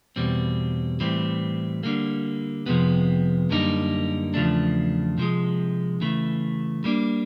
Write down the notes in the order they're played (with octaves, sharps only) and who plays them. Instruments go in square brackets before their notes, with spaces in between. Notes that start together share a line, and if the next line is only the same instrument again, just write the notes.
[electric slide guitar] E2 B2 G3 C4
A2 E3 G3 C4
D3 G3 A#3
F2 C3 F3 G#3 B3
F#2 D3 G3 A#3 D#4
E2 C#3 F3 A3 D4
C3 F3 G#3
C#3 E3 A3
G3 A#3 D4